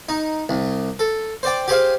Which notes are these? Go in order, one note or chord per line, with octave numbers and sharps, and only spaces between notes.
D#4
C2
A4
C5 D5 G5
G4 G#4 C5 F5